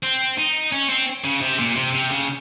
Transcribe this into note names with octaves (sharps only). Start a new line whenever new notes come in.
C4
D#4
C#4
C4
C#3
C3
A#2
C3
C3
C#3